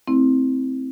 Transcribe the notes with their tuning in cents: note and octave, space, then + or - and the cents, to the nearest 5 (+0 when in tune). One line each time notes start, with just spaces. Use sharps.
A3 +0 C4 +0 E4 -15